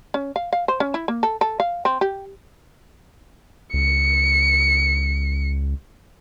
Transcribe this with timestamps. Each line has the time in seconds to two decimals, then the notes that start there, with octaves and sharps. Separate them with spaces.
0.14 C#4
0.36 F5
0.53 F5
0.68 C5
0.80 C#4
0.94 E4
1.08 A#3
1.23 A4
1.41 A4
1.60 F5
1.85 C4
2.01 G4
3.74 C#2 C#7